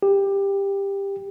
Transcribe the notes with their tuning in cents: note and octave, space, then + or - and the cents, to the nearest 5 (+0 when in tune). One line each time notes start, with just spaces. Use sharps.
G4 +15